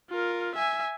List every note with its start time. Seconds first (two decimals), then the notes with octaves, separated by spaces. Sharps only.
0.10 F4 A#4
0.55 E5 G#5